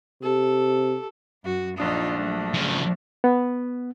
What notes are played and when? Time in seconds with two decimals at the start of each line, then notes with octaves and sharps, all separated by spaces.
0.23 C3 G4 A4
1.44 F#2 F#4
1.78 A#1 D4 D#4 F4 D#6
2.17 F#3 A3
2.54 C#3 F3
3.24 B3